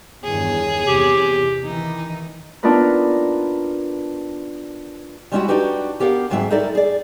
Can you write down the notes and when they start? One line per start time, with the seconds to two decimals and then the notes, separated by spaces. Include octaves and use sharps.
0.24 E2 G2 D#3 G#4 C#5
0.88 E2 C3 G4
1.65 D#3 E3 D#4
2.63 B3 D4 D#4 F4 A#4 B4
5.32 G3 G#3 C#4 D4 E4 F#4
5.48 D4 D#4 F#4 G4 B4
6.00 B3 G4 A#4 F5 F#5
6.30 D2 G#2 F#3 G#3 C4 E5
6.50 D#4 E4 A4 A#4 D5 E5
6.75 G#4 D5